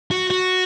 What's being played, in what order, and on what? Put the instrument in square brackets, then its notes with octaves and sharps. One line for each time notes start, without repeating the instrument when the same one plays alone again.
[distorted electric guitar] F#4
F#4